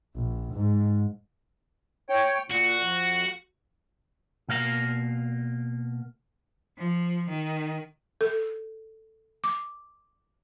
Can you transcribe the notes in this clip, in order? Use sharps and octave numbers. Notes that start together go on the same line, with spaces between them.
A#1
G#2
C#5 G5
A#2 F#4
F2
B2 A#3 F5 A#5
F3
D#3
A4
D6